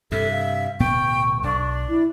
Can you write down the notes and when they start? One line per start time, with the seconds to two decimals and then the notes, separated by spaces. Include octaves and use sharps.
0.12 G2 C3 A4 E5
0.31 F5
0.80 D1 B2 B3 G5 C#6
1.43 B1 D4
1.89 E4